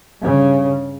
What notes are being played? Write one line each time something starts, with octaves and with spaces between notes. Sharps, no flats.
G2 C#3